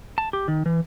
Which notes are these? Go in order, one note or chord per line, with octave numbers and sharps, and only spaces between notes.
A5
G4
D#3
E3